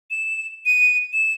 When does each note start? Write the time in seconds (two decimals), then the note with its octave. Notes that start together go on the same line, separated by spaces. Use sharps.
0.10 E7
0.65 D#7
1.13 E7